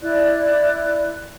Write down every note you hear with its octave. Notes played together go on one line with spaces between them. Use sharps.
E4 D5 F#6